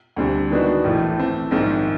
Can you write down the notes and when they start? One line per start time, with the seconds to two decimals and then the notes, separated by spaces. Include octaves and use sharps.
0.16 D2 D3 G3 C4
0.50 D#3 G#3 B3 D4 F#4
0.84 A#1 A2 E3 A3
1.18 E3 A3 C4
1.51 A#1 G#2 D#3 G#3 C4